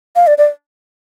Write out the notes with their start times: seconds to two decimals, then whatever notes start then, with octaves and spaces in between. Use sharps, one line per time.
0.16 F5
0.27 D5
0.38 D5